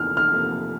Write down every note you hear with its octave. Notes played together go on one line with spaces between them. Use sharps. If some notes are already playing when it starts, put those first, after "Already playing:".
Already playing: E2 C3 F3 A#3 F6
F6
C3 F3 A#3